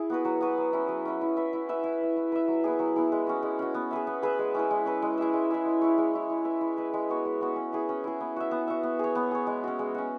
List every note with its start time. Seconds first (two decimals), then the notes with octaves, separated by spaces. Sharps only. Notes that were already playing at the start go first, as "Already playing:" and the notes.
Already playing: E4 G#4
0.10 B3 F#4 B4
0.25 F#3
0.41 B3 F#4 B4
0.57 F#3
0.73 C#4 E4
0.88 F#3
1.05 C#4 E4
1.21 E4
1.37 B4 E5
1.53 E4
1.69 B4 E5
1.84 E4
2.01 B4 E5
2.16 E4
2.32 B4 E5
2.48 F#3
2.64 B3 E4 G#4
2.79 F#3
2.96 B3 E4 G#4
3.12 G#3
3.27 C#4 F#4
3.43 G#3
3.59 C#4 F#4
3.74 B3
3.91 G#4 B4 E5
4.07 B3
4.22 G#4 B4 E5
4.39 G#3
4.55 C#4 E4 B4
4.71 G#3
4.86 C#4 E4 B4
5.02 G#3
5.18 E4 G#4 E5
5.33 G#3
5.50 E4 G#4 E5
5.65 G#3
5.82 E4 C#5
5.98 G#3
6.14 E4 C#5
6.29 E4
6.45 B4 E5
6.61 E4
6.77 B4 E5
6.94 G#3
7.09 B3 F#4 C#5
7.25 G#3
7.41 B3 F#4 C#5
7.56 C#4
7.72 E4 G#4
7.89 C#4
8.04 E4 G#4
8.20 B3
8.36 F#4 E5
8.51 B3
8.68 F#4 E5
8.83 B3
8.99 G#4 C#5
9.15 B3
9.31 G#4 C#5
9.47 G#3
9.64 C#4 F#4
9.79 G#3
9.95 C#4 F#4